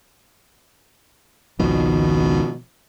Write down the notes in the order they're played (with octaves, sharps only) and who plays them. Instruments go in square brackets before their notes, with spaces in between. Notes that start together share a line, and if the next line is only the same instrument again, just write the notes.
[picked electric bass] G#1 C#2 F3 [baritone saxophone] B2 [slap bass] D#3